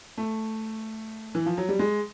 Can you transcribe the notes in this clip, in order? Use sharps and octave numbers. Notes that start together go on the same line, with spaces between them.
A3
E3
F3
F#3
G3
G#3